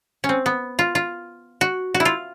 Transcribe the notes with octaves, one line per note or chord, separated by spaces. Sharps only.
C#4
C4
B3
F4
F4
F#4
F#4
E4
F4